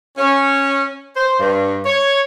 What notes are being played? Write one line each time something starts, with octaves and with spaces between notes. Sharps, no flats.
C#4
C5
G2
C#5